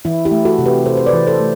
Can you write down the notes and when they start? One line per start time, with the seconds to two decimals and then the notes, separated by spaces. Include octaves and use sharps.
0.05 E3 E4
0.25 E4 G4
0.31 A3
0.45 F#4 A4
0.59 C3
0.66 G4 B4
0.86 C3 A4 C5
0.97 C5
1.06 B4 D5
1.13 E3
1.27 A4 C5
1.40 A3